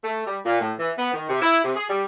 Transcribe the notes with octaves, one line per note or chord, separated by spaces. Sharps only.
A3
G3
A#2
A2
E3
B3
D#3
C3
E4
C3
G#4
G3